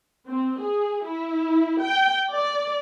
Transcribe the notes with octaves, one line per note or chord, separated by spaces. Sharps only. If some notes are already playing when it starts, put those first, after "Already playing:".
C4
G#4
E4
G5
D5